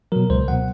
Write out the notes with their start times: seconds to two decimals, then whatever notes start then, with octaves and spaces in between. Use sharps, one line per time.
0.12 B2 F#3 A#4
0.30 C#2 C5
0.48 B2 F#3 F#5